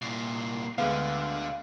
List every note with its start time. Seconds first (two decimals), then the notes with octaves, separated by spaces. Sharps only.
0.02 C2 A#2 C7
0.78 D2 D3 G#3 B3 F5